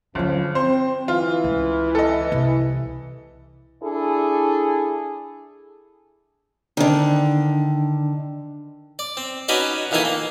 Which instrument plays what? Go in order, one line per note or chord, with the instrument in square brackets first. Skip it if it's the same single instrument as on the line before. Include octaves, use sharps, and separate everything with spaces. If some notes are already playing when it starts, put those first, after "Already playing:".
[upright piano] G1 [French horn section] C#3 F3 [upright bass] F#3 D4
[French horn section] C4 [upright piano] C5
[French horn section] E3 [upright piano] F4
[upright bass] C#2
[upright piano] A4 D#5
[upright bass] C2
[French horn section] D4 E4 G#4 A4
[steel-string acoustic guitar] D3 D#3 [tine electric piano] D4
[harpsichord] D5
C4
C#4 D#4 F#4 B4 D5 D#5
A#2 D#3 E3 D#4 A4 G#5
A#3